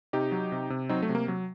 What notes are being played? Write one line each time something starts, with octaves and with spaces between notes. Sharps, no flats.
C3 D#4 G4
F#3
C3
C3
F#3 C4 D#4
A3
C3
A#3
F#3